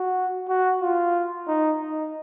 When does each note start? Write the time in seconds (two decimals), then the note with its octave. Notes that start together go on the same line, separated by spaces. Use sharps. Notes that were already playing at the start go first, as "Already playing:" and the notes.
Already playing: F#4
0.48 F#4
0.81 F4
1.48 D#4
1.81 D#4